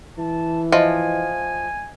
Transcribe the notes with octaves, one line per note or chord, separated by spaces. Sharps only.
E3 A5
F3 D#5 E5 G#5